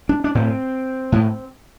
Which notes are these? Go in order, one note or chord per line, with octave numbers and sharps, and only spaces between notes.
D4
D4
A2 C4
A2